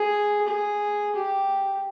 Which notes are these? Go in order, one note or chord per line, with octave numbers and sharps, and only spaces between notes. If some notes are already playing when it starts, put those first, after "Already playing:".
Already playing: G#4
G#4
G4